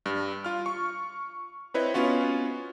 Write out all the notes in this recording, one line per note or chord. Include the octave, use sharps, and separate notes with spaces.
G2
F4 F6
C#6
C4 E4 B4 C#5 D#5
B3 C#4 F4 F#4